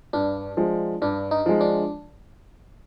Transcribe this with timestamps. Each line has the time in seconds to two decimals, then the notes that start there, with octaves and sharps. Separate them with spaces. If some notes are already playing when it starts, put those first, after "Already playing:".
0.13 G2 D4
0.57 F3 G#3
1.02 G2 D4
1.31 D#4
1.46 F3 G#3
1.61 D4